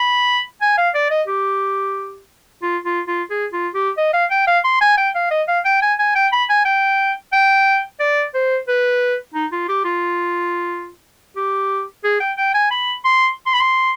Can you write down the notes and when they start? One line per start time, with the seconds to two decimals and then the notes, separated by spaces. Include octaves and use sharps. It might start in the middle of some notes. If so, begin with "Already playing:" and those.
Already playing: B5
0.61 G#5
0.78 F5
0.95 D5
1.11 D#5
1.28 G4
2.62 F4
2.85 F4
3.08 F4
3.30 G#4
3.53 F4
3.74 G4
3.97 D#5
4.14 F5
4.31 G5
4.47 F5
4.64 C6
4.81 G#5
4.98 G5
5.15 F5
5.31 D#5
5.48 F5
5.65 G5
5.82 G#5
5.99 G#5
6.15 G5
6.32 B5
6.49 G#5
6.65 G5
7.33 G5
8.00 D5
8.34 C5
8.68 B4
9.34 D#4
9.52 F4
9.69 G4
9.85 F4
11.37 G4
12.04 G#4
12.20 G5
12.37 G5
12.54 G#5
12.71 B5
13.05 C6
13.46 C6
13.53 B5
13.60 C6